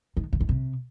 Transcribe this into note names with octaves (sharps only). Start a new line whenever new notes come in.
D#3
C#3
D#3
C3